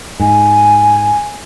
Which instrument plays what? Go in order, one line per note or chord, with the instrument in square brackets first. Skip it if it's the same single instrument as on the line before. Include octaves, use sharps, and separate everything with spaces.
[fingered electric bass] G#2 [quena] G#5